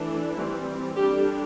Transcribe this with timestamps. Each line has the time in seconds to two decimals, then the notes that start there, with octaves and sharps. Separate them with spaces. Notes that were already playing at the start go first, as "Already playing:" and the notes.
Already playing: E3 A3 D4
0.35 E3 G3 C4 E4
0.96 D3 G3 D4 G4